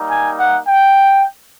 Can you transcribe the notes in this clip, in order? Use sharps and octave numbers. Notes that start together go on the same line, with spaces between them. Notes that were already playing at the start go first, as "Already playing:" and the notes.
Already playing: G3 A#3 D#4
G#5
F#5
G5